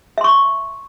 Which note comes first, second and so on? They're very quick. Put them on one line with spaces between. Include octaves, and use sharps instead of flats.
E5 C6 C#6